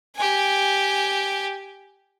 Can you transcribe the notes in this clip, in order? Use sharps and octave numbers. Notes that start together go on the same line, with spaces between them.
G4 G#5